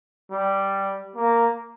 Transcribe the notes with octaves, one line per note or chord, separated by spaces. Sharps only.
G3
A#3